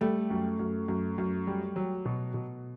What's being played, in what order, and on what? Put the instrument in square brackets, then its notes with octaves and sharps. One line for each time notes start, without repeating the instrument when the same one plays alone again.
[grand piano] G3 [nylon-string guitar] A3
[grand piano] F#2
F#2
F#2
F#2
G3
F#3
B2
B2